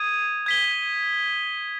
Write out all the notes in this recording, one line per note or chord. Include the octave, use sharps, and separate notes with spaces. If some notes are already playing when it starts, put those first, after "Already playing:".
Already playing: D#6 G#6 D#7
G#6 B6 G7